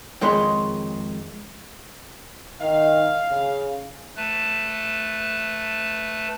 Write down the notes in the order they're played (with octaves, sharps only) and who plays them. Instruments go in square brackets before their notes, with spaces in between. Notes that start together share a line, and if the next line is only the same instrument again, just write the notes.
[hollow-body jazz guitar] F2 D#3 G#3 B4 C#5 C6
[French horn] D#3 [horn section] F5
[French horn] C#3
[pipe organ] A3 B4 A5